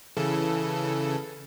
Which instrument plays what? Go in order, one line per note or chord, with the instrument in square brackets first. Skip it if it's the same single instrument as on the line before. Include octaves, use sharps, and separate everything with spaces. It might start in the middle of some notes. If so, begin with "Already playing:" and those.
[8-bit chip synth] C#3 E3 A4